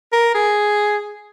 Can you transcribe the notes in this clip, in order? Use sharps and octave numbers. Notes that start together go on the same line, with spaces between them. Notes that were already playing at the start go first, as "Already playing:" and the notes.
A#4
G#4